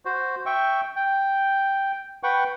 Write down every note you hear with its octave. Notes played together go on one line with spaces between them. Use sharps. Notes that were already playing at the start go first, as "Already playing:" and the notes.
F#4 C5
E5 G5 C#6
G5
B4 F#5 G5 C#6